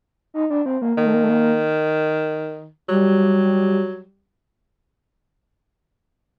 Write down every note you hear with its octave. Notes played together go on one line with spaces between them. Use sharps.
D#4
D4
C4
A#3
D#3 A#3
A3
A#3
A3
A#3
F#3 G3